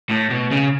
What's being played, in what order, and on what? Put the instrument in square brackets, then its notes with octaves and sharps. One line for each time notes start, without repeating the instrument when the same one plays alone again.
[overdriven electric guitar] A2
B2
C#3